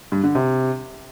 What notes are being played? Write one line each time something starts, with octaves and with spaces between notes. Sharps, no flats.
G2
D3
C3